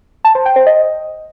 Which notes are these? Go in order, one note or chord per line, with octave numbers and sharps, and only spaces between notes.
A5
C5
G5
C5
D#5